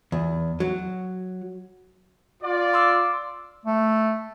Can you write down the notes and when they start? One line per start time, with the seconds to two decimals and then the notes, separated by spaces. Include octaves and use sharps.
0.12 E2
0.60 F#3
2.42 F4 D5
2.73 C6 D6 E6
3.66 A3